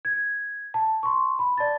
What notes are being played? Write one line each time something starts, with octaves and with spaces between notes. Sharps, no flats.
G#6
A5
C6 C#6
B5
D5 A5 A6